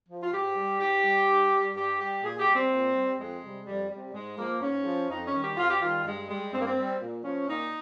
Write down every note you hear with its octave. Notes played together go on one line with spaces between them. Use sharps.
F3
F4
G#2 G4
G3
G#2 G4
G3
G2
G3
G2 G4
G3 G4
A#2 G#4
G4
G3
C4
A#2
G3
F2 G#3
C3 G3
F2 G3
C3 G3
G#2 G#3
F3 A#3
G#2 C#4
F3
F2 D#4
C#4
D#3 G3
G4
F2 F4
G4
D#3 G3 F4
G2 G#3
G3 G#3
G2 C4
A#3
C4
G3
A#2
F3 C#4
A#2 D#4